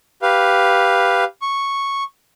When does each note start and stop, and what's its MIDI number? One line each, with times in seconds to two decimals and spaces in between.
0.22 1.24 67
0.22 1.24 71
0.22 1.24 77
1.42 2.03 85